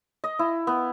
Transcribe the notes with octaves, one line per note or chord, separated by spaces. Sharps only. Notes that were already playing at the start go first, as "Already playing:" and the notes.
D#5
E4
B3